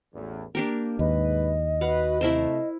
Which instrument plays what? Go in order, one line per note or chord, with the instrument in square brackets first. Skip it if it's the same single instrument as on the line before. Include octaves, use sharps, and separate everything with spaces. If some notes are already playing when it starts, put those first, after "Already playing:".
[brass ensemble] A1 E2
[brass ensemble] A#3 [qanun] D4 G4 A#4
[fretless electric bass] D#2 [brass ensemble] G#2 B4 [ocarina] D#5
[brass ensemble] F#4 B4 [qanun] F5 F#5
[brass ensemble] C3 A3 [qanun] E4 A#4 C5